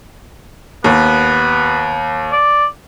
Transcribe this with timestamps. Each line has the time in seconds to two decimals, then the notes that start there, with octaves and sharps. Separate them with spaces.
0.84 D#2 B3
2.32 D5